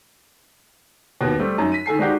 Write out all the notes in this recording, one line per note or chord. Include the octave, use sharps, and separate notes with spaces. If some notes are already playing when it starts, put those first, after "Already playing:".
D#2 B2
G3 A3 C4
F#2 D#4
B6 D#7
D#3 A4 G#5 C7
G#3 C4 D4 D#4 F#4 G4